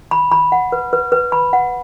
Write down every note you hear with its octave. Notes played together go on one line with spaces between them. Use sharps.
B5
B5
F#5
B4
B4
B4
B5
F#5